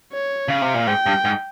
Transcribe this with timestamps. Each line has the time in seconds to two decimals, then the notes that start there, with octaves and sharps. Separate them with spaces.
0.13 C#5
0.48 C#3 F5
0.61 C3
0.74 A#2
0.87 G#2 G5
1.06 G2
1.25 G#2